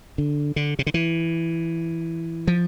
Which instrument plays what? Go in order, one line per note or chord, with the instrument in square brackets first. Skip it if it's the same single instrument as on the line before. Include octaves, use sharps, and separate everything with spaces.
[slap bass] D3
D3
C3
D3
E3
F3